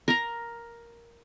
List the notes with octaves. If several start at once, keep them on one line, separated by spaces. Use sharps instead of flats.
A#4 A#5